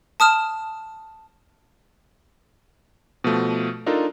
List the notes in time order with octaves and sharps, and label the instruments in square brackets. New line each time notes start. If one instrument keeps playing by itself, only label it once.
[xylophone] A5 D#6 F6 E7
[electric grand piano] B2 F3 A3
D4 D#4 F4 A4 A#4